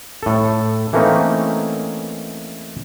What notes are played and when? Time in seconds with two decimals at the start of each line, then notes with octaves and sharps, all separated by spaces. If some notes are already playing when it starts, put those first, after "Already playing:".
0.23 A2 A4
0.93 E3 A3 A#3 C4 C#4 D#4